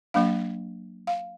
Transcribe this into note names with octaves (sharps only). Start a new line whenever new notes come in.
F#3 A#3 D4 F5
F5